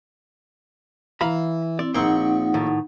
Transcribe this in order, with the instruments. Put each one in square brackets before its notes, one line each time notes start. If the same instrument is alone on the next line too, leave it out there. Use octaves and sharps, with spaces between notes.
[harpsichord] E3 [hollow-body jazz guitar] F5 A#5 B5
[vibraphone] C4 E4 [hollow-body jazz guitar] D5
[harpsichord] A#1 C#6 [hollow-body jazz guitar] A#3 C4 [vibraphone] D#4 F#5
[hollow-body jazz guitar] A2 D#3